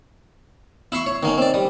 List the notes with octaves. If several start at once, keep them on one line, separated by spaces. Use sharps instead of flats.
E4 E5 C6 C#6
C#5
D#3 A#3 C#4
C4 D5
G3